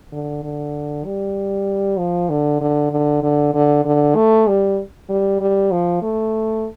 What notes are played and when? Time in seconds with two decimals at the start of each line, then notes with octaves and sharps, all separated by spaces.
0.12 D3
0.43 D3
1.06 G3
1.98 F3
2.30 D3
2.61 D3
2.91 D3
3.23 D3
3.54 D3
3.85 D3
4.15 A3
4.47 G3
5.09 G3
5.41 G3
5.71 F3
6.02 A3